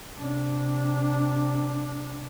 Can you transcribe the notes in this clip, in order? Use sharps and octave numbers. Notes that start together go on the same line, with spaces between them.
C3 D4